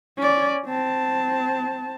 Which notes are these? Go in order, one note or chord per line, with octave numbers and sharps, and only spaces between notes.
C#4 D5
C4 A5